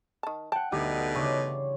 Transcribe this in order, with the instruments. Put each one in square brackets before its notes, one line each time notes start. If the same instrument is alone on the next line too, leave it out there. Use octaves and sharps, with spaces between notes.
[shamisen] D#3 A5
[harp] F#5 G5 [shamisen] A5
[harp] D2 [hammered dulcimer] G2 E3 E5 [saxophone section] B2 D3 D#4 [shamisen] G4
[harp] C#3 [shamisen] A3 [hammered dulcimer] C#5 D5 C6